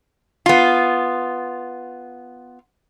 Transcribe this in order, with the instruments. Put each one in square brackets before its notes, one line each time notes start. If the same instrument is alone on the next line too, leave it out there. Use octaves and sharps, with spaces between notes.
[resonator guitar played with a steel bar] B3 F4